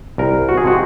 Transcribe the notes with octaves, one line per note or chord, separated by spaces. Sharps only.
C2 A#4
F#4
G#4
C3 F3 G#3 C4 F#4